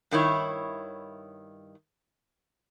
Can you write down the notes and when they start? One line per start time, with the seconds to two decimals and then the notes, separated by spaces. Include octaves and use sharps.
0.11 G2 D#3 E4 C#5